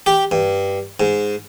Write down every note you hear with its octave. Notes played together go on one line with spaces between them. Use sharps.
G4
G2
G#2